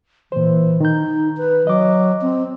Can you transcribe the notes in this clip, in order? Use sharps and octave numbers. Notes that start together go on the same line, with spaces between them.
A#2 E3 C5
D#3 D#4 G6
B4
F#3 D#5 D6
C4